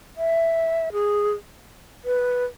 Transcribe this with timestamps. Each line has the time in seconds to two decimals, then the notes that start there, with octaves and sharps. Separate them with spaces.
0.17 E5
0.93 G#4
2.05 B4